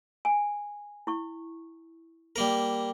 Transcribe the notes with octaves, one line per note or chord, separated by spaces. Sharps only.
G#5
E4 C#6
G3 A#3 A#4